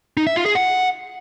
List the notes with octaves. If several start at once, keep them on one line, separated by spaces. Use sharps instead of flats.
D#4
E5
F4
G#4
F#5